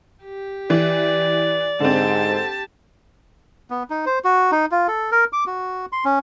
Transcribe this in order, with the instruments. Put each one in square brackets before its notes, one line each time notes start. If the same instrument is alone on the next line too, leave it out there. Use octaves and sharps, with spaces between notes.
[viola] G4
[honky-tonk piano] E3 [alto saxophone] D5
[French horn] G#2 [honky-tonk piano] D3 C4 [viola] G4 A5
[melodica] B3
D#4
C5
F#4
D#4
F4
A4
A#4
D6
F#4
C6
C#4